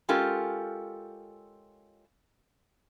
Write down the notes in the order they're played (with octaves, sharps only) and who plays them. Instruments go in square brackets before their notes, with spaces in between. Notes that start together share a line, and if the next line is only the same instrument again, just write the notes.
[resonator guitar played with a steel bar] G#3 C#4 F4 G4 A4 A#4